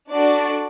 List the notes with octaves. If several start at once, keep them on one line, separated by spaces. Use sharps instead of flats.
D4 F#4 A4 D5